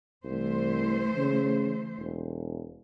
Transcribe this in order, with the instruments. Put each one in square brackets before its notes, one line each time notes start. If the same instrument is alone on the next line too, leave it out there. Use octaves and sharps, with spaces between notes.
[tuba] C2 [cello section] E3 A3 C5
[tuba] C#3
E1